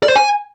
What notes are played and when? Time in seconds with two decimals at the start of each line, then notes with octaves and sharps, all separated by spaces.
0.03 D5
0.09 C5
0.16 G#5